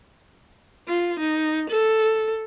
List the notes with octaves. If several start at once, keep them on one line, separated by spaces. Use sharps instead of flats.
F4
D#4
A4